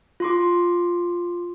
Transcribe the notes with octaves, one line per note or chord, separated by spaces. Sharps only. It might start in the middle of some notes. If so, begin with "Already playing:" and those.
F4 C6 D6